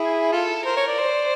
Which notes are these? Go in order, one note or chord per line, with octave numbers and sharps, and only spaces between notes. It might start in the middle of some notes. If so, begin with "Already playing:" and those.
Already playing: E4 G#4
F4 A4
A#4 C5
C#5
D5
C5